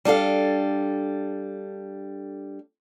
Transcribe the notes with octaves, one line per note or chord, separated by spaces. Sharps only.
G3 D4 A4 F5